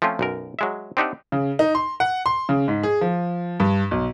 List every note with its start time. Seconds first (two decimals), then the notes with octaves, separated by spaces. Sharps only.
0.02 F3 A3 C4 C#4 F4
0.19 B1 F#2 A#4
0.59 F#3 G#3 E5
0.97 C4 D4 D#4 G4 E5 F#5
1.32 C#3
1.59 D#4
1.75 C6
2.00 F#5
2.26 C6
2.49 C#3
2.68 G#2
2.83 G#4
3.01 F3
3.60 G2
3.91 B1